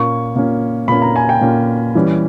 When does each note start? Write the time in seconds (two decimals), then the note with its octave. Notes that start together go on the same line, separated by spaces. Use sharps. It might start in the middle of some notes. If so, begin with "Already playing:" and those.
Already playing: A#2 A#3 C#4 C#6
0.36 A#2 A#3 C#4
0.88 A#2 A#3 C#4 B5
1.02 A#5
1.16 G#5
1.29 G5
1.41 A#2 A#3 C#4
1.95 E3 G3 C#4